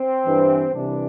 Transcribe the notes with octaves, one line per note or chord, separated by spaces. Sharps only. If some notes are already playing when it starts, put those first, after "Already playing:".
Already playing: C4
G2 E3
C2 C3 E3 D4